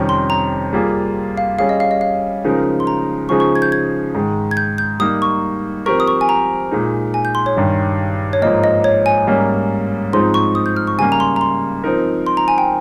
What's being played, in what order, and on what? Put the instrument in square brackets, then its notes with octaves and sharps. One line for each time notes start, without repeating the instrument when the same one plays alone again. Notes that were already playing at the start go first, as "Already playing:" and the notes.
Already playing: [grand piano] F2 C3 D#3 G3 C#4
[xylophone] C6
A#5
[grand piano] G3 A#3 F4 G#4
[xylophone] F5
[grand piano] G3 C#4 G#4 [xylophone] F5
[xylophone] D#5
F5
D#5
F5
[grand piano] C#3 F3 G#3 D#4 A#4
[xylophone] C6
A#5
[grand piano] C#3 F3 G#3 D#4 G#4 [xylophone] C#6
[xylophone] C#6
G#6
G6
G#6
[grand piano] G#2 D#3 G#3
[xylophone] G#6
G6
G6
[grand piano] G3 A#3 D#4 [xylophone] D#6
[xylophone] C#6
[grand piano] F3 C4 G4 A#4 [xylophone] C#6
[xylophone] D#6
C#6
G#5
A#5
[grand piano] A#2 G#3 D#4
[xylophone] G#5
G6
C6
C#5
[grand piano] G2 D#3 G3
[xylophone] C#5
[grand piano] G#2 F3 A#3 [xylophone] D#5
[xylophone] D#5
C#5
G#5
[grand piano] G#2 G3 A#3 C#4
[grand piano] G#2 F3 G#3 C4 D#4 [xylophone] C6
[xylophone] C#6
D#6
G6
F6
C#6
[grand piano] C#3 G3 A#3 [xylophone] G#5
[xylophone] A#5
C6
A#5
C6
[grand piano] F3 C4 D#4 A#4
[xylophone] C6
A#5
G#5
G5